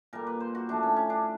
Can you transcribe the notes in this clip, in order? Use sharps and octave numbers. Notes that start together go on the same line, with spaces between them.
A#2 G3 A#3 A#4
B4
C5
F#4
A2 F3 A3 D4
C#4
C#4
D4